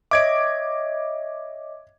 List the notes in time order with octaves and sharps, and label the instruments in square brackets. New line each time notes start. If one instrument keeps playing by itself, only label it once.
[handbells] C#5 D#5 E5 [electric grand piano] D6 G#6 D7